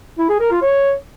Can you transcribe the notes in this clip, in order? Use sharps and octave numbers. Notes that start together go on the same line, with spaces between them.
E4
G#4
A#4
F4
C#5